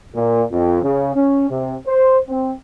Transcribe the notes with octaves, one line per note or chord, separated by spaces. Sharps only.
A#2
F2
C#3
C#4
C3
C5
C4